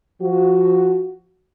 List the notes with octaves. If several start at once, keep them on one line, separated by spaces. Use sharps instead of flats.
F3 F#4